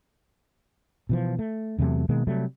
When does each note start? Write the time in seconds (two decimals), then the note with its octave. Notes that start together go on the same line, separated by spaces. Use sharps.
1.09 B2 E3 F3
1.39 A3
1.79 E2 C3 F#3 A3
2.09 B2 D#3 G#3 A#3
2.27 C3 F#3 G3 A3